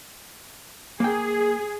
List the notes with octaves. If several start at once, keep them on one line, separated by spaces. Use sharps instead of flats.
A#3 G#4 G5